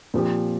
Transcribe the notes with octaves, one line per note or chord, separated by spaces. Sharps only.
A#2 F3 C4 G4